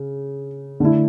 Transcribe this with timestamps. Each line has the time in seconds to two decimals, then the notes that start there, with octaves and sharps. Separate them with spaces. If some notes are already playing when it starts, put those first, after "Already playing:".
Already playing: C#3
0.80 D3 A3 E4